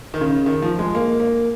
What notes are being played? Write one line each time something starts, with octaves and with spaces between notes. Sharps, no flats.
D#3
C#3
D#3
F3
G#3
A#3
A#3